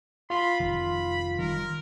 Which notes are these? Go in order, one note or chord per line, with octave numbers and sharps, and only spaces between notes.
F4 B5 C6
F1 D#3 B5
D#3 G3 A#4